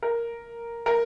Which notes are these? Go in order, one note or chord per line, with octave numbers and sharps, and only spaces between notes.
A#4
A#4